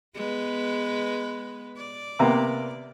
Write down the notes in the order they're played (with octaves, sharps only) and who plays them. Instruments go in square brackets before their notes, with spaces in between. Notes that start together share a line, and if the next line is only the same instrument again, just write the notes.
[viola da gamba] G#3 B3 B4
D5
[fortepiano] C3 A#3 B3